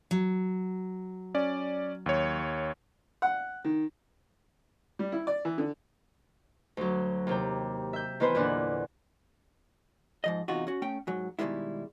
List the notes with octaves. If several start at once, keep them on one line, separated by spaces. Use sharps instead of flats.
F#3
C#4 D5
D#2 C#5
F#5
D#3
G3
E4
D5
E3
D3
D2 F#3
D#2 C3 G5
E5 G6
D#3 E3 B3 B4 C5
E2 A#2 D3 D4 F#5
G#2 F3 D#5
E2 C3 D#4 F4 F#4
C#4 F#4
A3 C#4 G5
G#2 F#3
B2 D#3 E3 G3 G#3 E4